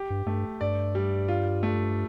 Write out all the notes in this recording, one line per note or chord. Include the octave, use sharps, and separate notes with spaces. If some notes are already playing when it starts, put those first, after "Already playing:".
Already playing: G4
G2
G2 A3
G2 D5
G3
F4
A3